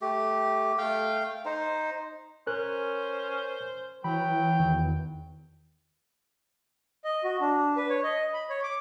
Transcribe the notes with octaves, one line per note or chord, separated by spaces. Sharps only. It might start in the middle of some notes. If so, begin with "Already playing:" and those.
A3 G4
A3 F5 G5
D#4 C5
C#4 A#4 C5 F#6
E3 F#3 G5 B5
E2 D#3
D#5
F#4
D4
B4
C#5
D#5
B5
C#5
D6